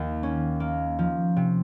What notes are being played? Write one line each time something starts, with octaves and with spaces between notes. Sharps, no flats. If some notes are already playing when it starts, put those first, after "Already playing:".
Already playing: D#2 D#3 A#3
C#4
A#3
F3
C3